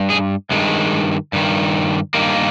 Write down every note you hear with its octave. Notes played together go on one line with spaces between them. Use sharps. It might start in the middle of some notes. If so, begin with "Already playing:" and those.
Already playing: G2
G#4
G2 D#3 G#3
G2 D#3
G2 D#3 A#3